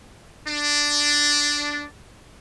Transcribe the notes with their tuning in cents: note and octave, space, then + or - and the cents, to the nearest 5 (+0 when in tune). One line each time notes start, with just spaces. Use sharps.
D4 -5